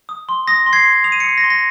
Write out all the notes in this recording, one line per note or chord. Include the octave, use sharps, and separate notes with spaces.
D#6
C6
D#6 A#6
C6
G#6 C7
C6
D#6 F7
D#7
C#7
D#6 C7
A#6
C6
A#6